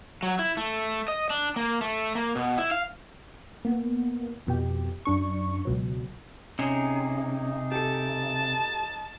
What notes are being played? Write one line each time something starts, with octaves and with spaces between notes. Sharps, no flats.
F#3
E4
A3
D#5
D4
A#3
A3
A#3
B2
E4
F5
A#3 B3
F2 B2 G4
F#2 D4 C#6
C#2 B2 F#3
C3 C#4 D#4 G#4
G4 A4 A5